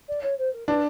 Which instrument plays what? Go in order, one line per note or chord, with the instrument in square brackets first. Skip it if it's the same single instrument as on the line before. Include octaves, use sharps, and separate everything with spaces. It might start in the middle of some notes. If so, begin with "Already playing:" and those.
[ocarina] D5
C#5
C5
A#4
[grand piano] D4 [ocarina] B4